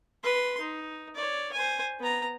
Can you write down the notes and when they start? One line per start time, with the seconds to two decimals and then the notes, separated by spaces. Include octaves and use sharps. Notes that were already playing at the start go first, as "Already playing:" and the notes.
0.23 B4 C6
0.60 D#4
1.15 C#5 D5
1.53 C5 G#5
2.00 B3 A#5